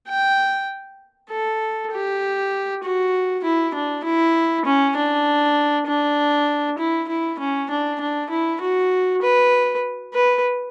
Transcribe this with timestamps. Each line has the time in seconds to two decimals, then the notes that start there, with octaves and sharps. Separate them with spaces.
0.09 G5
1.30 A4
1.92 G4
2.83 F#4
3.44 E4
3.74 D4
4.04 E4
4.65 C#4
4.96 D4
5.87 D4
6.78 E4
7.08 E4
7.40 C#4
7.70 D4
8.01 D4
8.30 E4
8.61 F#4
9.22 B4
10.14 B4